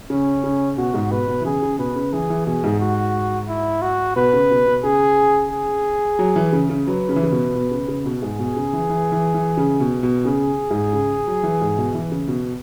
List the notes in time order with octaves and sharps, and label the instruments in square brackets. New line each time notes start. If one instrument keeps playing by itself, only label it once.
[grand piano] C#3 [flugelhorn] C#4
[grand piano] C#3
[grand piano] B2 [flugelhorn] F#4
[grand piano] G#2
[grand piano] B2 [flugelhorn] B4
[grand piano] B2
E3
[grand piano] C#3 [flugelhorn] G#4
[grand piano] C#3
[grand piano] B2 [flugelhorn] B4
[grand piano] C#3
[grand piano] E3 [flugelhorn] G#4
[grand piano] E3
[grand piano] B2 [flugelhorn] G#4
[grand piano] G#2
[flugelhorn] F#4
E4
F#4
[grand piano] B2 [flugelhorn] B4
[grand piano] C#3
B2
B2
[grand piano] C#3 [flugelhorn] G#4
[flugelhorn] G#4
[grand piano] F#3
E3
C#3
C#3
[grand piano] F#3 [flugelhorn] B4
[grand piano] C#3
E3
C#3
B2
B2
C#3
C#3
B2
[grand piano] G#2 [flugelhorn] G#4
[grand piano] B2
C#3
E3
E3
E3
E3
C#3
B2
B2
[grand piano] C#3 [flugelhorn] G#4
[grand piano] G#2
C#3
F#3
E3
G#2
B2
E3
C#3
B2